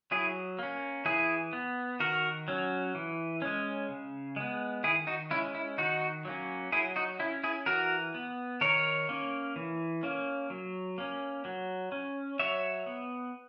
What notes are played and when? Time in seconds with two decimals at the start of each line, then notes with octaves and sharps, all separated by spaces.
0.11 F#3 E4 G#4
0.59 A#3 C#4
1.05 E3 E4 G#4
1.53 B3
2.00 D#3 F#4 A#4
2.48 F#3 C#4
2.95 E3
3.42 G#3 C#4
3.89 C#3
4.36 G#3 B3
4.83 D#3 E4 G#4
5.07 D#4 F#4
5.31 G#3 C#4 E4
5.55 E4
5.78 D#3 D#4 F#4
6.25 F#3 A#3 C#4
6.72 F#3 E4 G#4
6.96 D#4 F#4
7.19 C#4 E4
7.44 E4 G#4
7.66 E3 F#4 A#4
8.14 B3
8.61 D#3 A#4 C#5
9.09 A#3 C#4
9.56 E3
10.03 A#3 C#4
10.50 F#3
10.98 A#3 C#4
11.45 F#3
11.92 C#4
12.39 F#3 C#5 E5
12.86 B3